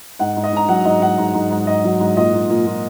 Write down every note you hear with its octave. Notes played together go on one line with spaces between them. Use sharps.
G#2 F#5
G#2
D#5
G#2 A#5
F#3 F#5
G#2 D#5
G#2 F#5
G#2
G#2
G#2
G#2 D#5
F#3
G#2
A#2 D#5
A#2
A#2
A#2